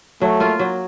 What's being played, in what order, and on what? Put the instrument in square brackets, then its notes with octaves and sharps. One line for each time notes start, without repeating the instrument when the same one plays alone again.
[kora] F#3 [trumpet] A3
[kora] A#3 F4
F#3